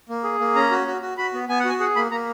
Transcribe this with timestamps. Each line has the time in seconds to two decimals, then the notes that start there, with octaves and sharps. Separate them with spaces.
0.09 A#3
0.24 G#4
0.40 A#3
0.55 C#4 A#5
0.71 F#4
0.87 F#4
1.02 F#4
1.17 F#4 B5
1.34 B3
1.49 B3 G#5
1.60 F#5
1.65 F#4 G#5
1.80 G#4 F#5
1.96 A#3 B5
2.11 A#3 A#5